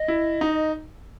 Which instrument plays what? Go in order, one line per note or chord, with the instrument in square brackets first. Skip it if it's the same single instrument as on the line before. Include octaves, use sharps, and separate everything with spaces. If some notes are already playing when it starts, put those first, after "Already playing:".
Already playing: [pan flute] D#5
[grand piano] E4
D#4